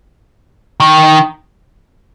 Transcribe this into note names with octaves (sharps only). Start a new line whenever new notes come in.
D#3